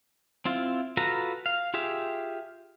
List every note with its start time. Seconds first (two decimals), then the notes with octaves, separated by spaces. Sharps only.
0.45 C4 E4 F4
0.97 F4 F#4 A4 B4 A#5
1.46 F5
1.74 F4 G4 G#4 E5